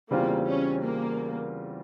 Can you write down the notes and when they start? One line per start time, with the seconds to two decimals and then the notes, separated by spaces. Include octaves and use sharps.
0.11 E2 C#3 G3 A#3 C4 F4
0.47 C#4
0.83 A#3